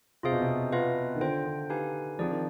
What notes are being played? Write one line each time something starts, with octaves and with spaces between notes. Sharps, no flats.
C3 F4 G#4 C5 F5
B2
C3
B3 F4 B4 F5
D#3
D3 F4 C5 G5
D3
D#4 G4 B4 F5 G#5
F3 C4 D#4 G#4 D5
D#3